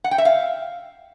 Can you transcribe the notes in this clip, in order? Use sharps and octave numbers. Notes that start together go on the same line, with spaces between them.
F#5
G5
E5
F5